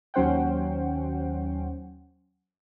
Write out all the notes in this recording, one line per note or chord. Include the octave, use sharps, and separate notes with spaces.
D#2 F#3 C#4 C5 F#5 G5